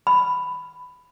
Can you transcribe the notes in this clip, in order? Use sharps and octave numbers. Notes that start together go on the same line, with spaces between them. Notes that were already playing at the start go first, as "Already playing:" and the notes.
B5